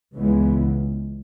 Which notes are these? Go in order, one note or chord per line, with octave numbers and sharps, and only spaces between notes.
C#2 C#3 E3 G#3 B3